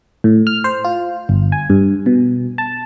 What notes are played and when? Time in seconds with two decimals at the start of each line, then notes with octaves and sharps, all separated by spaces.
0.24 A2
0.47 F6
0.64 C5
0.85 F4
1.29 G1
1.52 G#5
1.70 G2
2.06 B2
2.58 A5